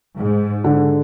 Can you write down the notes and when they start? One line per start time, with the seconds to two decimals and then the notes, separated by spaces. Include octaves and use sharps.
0.18 G#2
0.64 D3